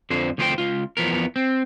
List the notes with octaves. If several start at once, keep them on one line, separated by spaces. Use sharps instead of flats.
F2 D3 F3 C5
D2 F3 F4 G4 C5 G5
C#2 F4
E2 F3 B3 A#4
C4